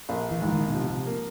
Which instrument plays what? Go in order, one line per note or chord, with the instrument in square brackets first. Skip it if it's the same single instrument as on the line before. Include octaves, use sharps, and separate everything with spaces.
[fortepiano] A#1
[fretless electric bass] E3
[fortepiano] G#2 [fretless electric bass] E3
[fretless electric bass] D#3
B2
[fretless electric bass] C3 [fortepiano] F3
[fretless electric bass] C3
[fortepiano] A#3